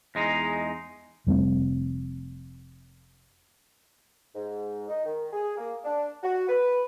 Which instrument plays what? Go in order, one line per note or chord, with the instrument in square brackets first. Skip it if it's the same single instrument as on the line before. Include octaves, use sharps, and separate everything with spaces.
[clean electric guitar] E2 G#3 D#4
[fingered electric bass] F1 G3 A3 C4
[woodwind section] G#2
D#4
D#3
G#4
A#3
D4
F#4
B4